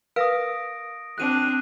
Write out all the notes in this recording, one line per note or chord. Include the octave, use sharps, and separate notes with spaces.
A#4 B4 F5 D#6 A#6 D7
C4 D4 F#6 D#7